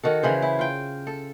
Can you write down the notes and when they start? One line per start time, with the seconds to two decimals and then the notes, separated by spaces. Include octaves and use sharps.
0.04 D#3 F#4 A4
0.23 C#3 E3 G#4 C5
0.42 E4
0.59 F4 G5
1.07 A4